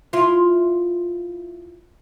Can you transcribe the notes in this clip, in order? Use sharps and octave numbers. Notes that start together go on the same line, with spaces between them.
E4 F4